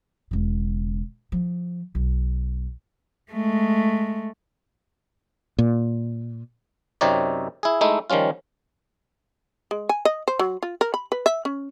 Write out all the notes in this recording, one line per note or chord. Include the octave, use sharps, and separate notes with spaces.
E1 C#3
F3
B1
G#3 A3
A#2
F#2 C3 C4 D#4 C#5 D5
E4 G#4
G#3 A3 D#4 E4
D#3 F3 G3 C#4 F4
G#3
G#5
D#5
C5
F#3
F4
A#4
B5
B4
E5
C#4